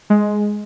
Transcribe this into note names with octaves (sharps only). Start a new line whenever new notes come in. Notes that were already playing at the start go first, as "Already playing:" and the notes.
G#3